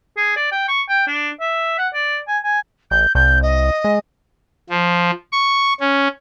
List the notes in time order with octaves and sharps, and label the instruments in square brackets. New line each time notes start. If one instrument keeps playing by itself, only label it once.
[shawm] G#4
D5
G5
C#6
G5
D4
E5
F#5
D5
G#5
G#5
[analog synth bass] A1 [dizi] G6
[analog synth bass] C2 [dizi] G6
[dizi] D#5
[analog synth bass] G#3
[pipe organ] F3
C#6
C#4